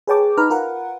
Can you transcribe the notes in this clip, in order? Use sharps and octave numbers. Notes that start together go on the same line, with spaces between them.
G#4 B4 C#5 G5 A5 D6
D#4 B4 A#5 F6
F4 A#4 B4 F#5